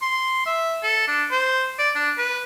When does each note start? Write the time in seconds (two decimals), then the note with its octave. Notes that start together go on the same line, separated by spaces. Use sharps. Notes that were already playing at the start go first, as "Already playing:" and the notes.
0.02 C6
0.46 E5
0.83 A4
1.08 D4
1.31 C5
1.79 D5
1.95 D4
2.18 B4